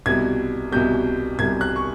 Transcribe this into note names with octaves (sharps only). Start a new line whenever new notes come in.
C2 B2 G3 G#6
C2 B2 G3 G6
C2 B2 G3 G#6
F#6
C#6